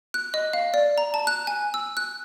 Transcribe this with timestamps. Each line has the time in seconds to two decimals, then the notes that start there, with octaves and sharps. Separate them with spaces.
0.14 F#6
0.34 D#5
0.53 F5
0.74 D5
0.98 A#5
1.14 A5
1.27 F#6
1.47 G#5
1.74 E6
1.97 F#6